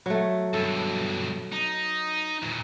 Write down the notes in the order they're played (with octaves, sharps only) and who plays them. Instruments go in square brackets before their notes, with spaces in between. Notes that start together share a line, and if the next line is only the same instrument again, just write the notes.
[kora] F#3 A3
[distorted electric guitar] G2 B2 [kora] A4
[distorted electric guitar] D#4
E2 A#2